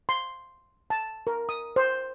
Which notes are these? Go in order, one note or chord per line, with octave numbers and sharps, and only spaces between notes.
C6
A5
A#4
D#6
C5